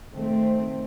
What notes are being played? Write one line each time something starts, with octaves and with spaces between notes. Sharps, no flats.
D#3 A3 C4